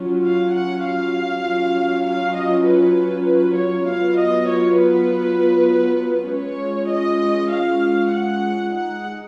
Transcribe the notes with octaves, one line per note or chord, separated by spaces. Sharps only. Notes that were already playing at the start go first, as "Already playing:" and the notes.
Already playing: F#3 C#4 F4
F5
F#5
F5
F#3 C#4 F4
F5
D#5
B4
B4
C#5
F#3 B3 F4 F5
D#5
C#5
B4
G#3 C#4 F4 C#5
D#5
F5
F#5
G#3 D#4 F#5